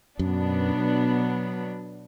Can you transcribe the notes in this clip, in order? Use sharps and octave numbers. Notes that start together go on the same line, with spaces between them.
F#2 B2 F#3 B3 D4